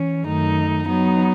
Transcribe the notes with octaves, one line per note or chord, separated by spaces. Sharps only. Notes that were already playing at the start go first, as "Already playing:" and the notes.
Already playing: E3 C#4
F#2 D#3 A3 D#4
F#3 B3 D#4